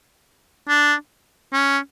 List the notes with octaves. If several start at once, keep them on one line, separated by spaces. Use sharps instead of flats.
D4
C#4